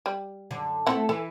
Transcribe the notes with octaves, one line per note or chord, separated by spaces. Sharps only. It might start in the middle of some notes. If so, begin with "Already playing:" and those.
G3
F#2 D3
A3 C4 E4 A4 F#5
E3 A4